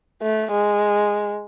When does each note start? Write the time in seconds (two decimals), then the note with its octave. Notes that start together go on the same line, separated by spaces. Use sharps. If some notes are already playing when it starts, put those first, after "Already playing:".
0.22 A3
0.51 G#3